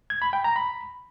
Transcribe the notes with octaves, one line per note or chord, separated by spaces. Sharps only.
G#6
B5
G5
A#5
B5